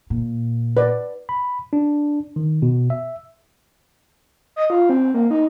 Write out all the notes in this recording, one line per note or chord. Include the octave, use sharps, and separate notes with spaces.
A#2
B4 D5
B5
D4
D#3
B2
E5
D#5
F4
C4
A#3
D#4